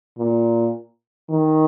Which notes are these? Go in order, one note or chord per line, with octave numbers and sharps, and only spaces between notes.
A#2
D#3